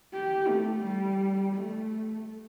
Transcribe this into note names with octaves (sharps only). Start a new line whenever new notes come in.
G4
A3
G3
A3